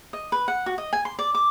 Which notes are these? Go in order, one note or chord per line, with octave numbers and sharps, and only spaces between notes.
D#5
B4
F#5
F#4
D#5
G#5
C6
D5
D6